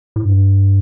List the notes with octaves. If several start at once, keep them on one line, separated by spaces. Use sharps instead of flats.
A2
G2